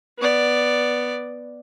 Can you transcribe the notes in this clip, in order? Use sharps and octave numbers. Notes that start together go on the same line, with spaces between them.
B3 D5